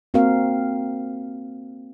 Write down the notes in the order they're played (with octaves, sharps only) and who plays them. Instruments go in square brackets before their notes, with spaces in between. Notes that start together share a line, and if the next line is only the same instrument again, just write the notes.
[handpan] A#3 C4 F#4 A#4 F5